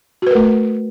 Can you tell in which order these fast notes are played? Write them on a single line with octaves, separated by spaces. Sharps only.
F#4 B4 A#4 A3